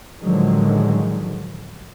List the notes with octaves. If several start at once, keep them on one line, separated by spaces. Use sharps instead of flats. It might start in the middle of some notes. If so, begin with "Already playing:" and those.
A2 D3 D#3 F3 F#3 G#3